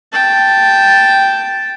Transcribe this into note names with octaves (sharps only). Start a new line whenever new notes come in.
G5 A5